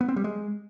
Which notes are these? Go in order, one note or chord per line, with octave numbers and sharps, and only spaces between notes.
B3
C4
G3
G#3